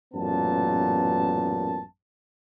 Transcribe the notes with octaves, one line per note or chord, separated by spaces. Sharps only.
A1 F#2 A#2 B3 A5